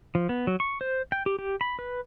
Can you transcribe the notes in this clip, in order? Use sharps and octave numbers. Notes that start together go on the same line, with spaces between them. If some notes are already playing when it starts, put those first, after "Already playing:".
F3
B3
F#3
C#6
C5
G5
G4
G4
B5
B4